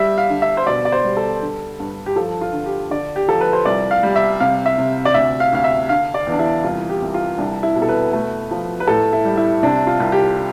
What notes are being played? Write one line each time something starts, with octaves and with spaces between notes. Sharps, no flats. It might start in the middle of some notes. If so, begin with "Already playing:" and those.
Already playing: G3 E5
F5
D3
E5
C5
B2 D5
D5
C5
G3
A4
D3
G2
G4
F3 A4
F4
D3
G4
D3 D5
G4
F3 A4
B4
C5
C2 D5
F5
G3
E5
C3 F5
E5
C3
D5
D2 E5
F5
D2 F5
E5
D3 F5
D5
E2
D4
E4
C2 F4
G4
C2
F4
C2 D4
E4
B2
A4
B4
A3
F3
B4
A2 A4
E4
G3
E4
C3 D4
F4
C2
G4